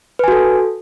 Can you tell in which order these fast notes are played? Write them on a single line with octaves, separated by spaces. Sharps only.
B4 G#5 F#4 A4